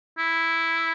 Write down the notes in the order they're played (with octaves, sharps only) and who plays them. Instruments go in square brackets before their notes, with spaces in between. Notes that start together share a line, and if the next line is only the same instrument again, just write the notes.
[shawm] E4